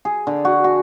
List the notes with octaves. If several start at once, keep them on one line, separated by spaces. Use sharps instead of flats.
G#4
D3
F#4
F#4